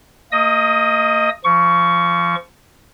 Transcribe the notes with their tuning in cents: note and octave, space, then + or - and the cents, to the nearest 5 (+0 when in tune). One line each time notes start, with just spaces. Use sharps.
A#3 -35 D#5 +0 D#6 +25
F3 -25 C#6 +15